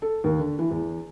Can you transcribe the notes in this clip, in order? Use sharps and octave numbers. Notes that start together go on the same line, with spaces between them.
A4
D#2
D3
E3
E2